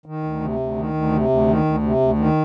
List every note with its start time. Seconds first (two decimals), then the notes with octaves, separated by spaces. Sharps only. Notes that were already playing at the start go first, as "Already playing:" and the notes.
0.06 D#3
0.24 D2
0.41 C3
0.59 D2
0.77 D#3
0.93 D2
1.12 C3
1.29 D2
1.48 D#3
1.64 D2
1.83 C3
2.00 D2
2.18 D#3